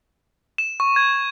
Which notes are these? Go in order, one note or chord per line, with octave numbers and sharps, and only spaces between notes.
E7
C#6
G#6